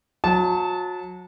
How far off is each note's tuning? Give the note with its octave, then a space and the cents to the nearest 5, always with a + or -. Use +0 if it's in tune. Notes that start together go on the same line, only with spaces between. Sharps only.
F#3 -35 A5 -20